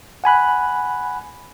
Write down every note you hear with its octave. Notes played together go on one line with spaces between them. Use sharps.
F#5 G#5 B5 F#6